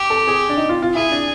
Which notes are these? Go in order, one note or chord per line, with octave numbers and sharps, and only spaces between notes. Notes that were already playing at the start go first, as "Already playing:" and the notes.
Already playing: G4
A4
G#4
D4
D#4
F4
F4
E4 G#4
D4